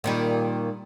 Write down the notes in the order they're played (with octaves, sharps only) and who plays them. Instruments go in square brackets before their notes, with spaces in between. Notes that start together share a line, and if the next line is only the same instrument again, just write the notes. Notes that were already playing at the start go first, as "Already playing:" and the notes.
[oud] A#2 D#3 G3